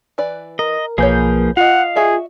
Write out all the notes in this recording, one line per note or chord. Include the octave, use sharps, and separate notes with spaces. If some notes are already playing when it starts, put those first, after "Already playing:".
E3 B4 D5
A#4 D#5
B1 F3 A#3 G#4 B4 C#5 G#5 G6
F4 D#5 F5 F#5
F#4 G#4 D5 E5